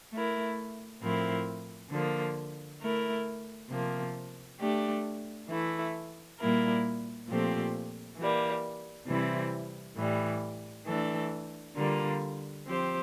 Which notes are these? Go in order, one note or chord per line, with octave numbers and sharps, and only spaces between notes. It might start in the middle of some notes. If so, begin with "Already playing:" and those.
A3 E4 A#4
A2 F3 C4 E4 A#4
D3 F3 A#3
A3 E4 A#4
C3 F3 A#3
A3 D4 G4
E3 A3 E4
A#2 G3 A#3 E4 A#4
A#2 F3 A3 C4 G4
E3 G3 A#3
C3 E3 G3 C4 E4
A2 E3 G3
E3 A3 D4 A4
D3 G3 A#3 F4
F3 C4 G4 C5